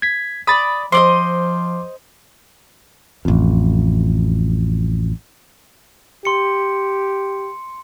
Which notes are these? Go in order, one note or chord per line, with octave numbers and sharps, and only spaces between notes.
G#6 B6
D5 B5 D#6 A6
F3 C5 D5 D#5 C6 D6
A1 F2
G4 C6 C#7